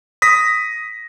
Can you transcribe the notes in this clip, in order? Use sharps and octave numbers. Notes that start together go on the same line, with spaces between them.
D#6 A#6 B6